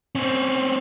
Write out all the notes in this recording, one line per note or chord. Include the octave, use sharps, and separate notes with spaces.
C4 C#4